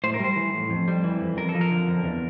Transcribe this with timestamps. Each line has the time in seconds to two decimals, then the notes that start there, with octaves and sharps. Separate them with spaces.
0.04 A2 C5
0.14 A#4
0.20 G3 C5
0.36 E3
0.54 A2
0.70 F2
0.88 G3
1.04 E3
1.21 F2
1.37 F2 A#4
1.49 A4
1.55 F3
1.61 A#4
1.71 D3
1.88 F2
2.04 E2